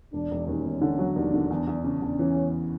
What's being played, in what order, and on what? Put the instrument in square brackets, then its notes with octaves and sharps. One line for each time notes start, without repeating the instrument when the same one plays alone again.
[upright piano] E1 [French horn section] D4
[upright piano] E1
[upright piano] D#2 [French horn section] C#4
[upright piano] E1
D3
F#3
[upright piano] D#2 [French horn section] D4
[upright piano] D3
[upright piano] E2 [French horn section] D4
[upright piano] E2
[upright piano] C#3 [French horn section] D4
[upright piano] E2
[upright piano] E3 [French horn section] C#4
[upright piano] E2